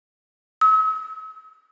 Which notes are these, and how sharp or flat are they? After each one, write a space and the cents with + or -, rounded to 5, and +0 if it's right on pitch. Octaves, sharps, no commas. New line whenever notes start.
E6 -45